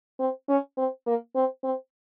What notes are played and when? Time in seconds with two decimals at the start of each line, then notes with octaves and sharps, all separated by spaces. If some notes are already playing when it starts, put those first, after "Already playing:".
0.19 C4
0.49 C#4
0.77 C4
1.07 A#3
1.35 C4
1.64 C4